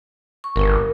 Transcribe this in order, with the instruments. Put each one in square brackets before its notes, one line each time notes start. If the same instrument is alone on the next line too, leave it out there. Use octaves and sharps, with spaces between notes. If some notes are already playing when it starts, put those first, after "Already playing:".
[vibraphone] C#6
[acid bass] G1 [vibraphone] A#4